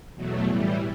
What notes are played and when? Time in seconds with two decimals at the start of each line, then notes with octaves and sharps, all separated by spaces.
0.14 E2 B2 F#3 A3
0.44 A2 E3 G3